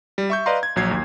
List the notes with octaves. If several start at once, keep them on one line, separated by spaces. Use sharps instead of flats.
G3
E5 C#6 G6
B4 D5 D#5 F5 A#5 C6
G#6
A#1 F#3 G#6 C7
D#2